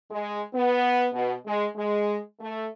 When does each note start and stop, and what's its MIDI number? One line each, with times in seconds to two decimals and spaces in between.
0.11 0.39 56
0.54 1.05 59
1.12 1.33 47
1.46 1.66 56
1.76 2.18 56
2.40 2.65 57